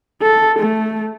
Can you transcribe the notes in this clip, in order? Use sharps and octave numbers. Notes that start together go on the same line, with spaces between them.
A4
A3